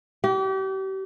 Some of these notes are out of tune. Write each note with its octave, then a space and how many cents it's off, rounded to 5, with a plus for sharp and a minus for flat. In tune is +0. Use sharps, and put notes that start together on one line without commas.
G4 -35